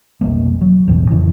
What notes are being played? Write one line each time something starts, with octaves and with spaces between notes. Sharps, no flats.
F1 B1 G3 A#3
F#3
A1 E2 G2 B2
F2 C#3 E3